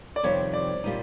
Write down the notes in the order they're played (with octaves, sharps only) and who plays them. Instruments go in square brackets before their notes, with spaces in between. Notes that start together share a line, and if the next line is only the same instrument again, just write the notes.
[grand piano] D5
[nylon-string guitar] F2 C3 D#3 G3 C4 [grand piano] C#5
[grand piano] D5
[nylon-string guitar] A#2 G3 A#3 D#4